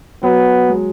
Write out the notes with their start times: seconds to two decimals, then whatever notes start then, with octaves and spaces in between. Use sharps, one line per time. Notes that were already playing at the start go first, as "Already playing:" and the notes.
0.23 F#3 B3
0.69 G#3